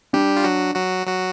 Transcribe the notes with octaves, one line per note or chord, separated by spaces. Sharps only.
G3 D4 G4
F4
F#3 F#4
F#3 F#4
F#3 F#4